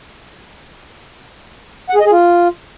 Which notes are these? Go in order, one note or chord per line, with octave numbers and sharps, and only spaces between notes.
F#5
G#4
D#5
G#4
F4